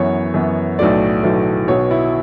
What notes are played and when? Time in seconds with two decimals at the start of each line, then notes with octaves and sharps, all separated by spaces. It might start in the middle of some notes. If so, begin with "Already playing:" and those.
Already playing: F#2 E3 B3 C#5
0.34 F#2 E3 B3
0.79 B1 A2 F#3 A3 D5
1.23 B1 A2 F#3 A3
1.68 B1 B2 F#3 C#5
1.91 E4